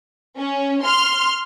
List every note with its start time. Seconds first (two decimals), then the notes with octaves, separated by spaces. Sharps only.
0.39 C#4
0.85 C6 F6